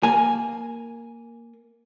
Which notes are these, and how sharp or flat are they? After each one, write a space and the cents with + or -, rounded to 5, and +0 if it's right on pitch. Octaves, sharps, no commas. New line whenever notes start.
A#3 +0 G#5 +0